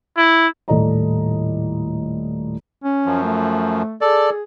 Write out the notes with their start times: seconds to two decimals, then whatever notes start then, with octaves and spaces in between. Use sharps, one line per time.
0.17 E4
0.68 D#1 A2 A4 D5 D#5 A#5
2.84 C#4
3.06 F#2 F3
3.23 A3
4.01 G#4 A4 D5